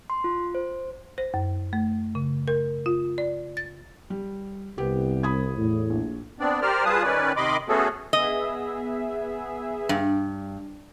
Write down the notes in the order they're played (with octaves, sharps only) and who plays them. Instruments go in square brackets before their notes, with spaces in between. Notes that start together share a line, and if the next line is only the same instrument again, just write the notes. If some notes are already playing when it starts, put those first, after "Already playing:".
[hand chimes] C6
F4
C5
[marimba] C5
F#2
A3
C#3
A#4
F4
D5
A6
[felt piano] G3
[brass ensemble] C2 [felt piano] B3 G4
[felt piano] B5 D#6 G#6
[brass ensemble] E2 A2
[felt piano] A#1
[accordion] B3 C4 D4 D5
G4 A#4 C5 D5 F6
G3 F4 G#4 B4 A5 D#6
D#3 C#4 B4 D5
C3 D#3 D#5 B5 C6 D6
A3 B3 C#4 F#4 G#4 A4
[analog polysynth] B3 G#4 E5 [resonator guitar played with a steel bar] D#5
[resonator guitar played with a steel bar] G2